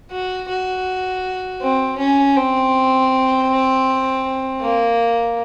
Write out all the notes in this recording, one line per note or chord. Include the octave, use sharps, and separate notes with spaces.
F#4
F#4
C4
C#4
C4
A#3